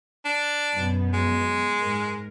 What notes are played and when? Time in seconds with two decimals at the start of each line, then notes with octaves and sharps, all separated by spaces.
0.25 D4
0.75 F#2 B2 B3
1.13 G#3
1.80 G#2 A#4